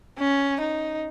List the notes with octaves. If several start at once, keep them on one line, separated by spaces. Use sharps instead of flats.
C#4
D#4